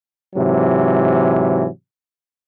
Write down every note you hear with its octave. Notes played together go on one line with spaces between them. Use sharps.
G#2 C3 E3 F#3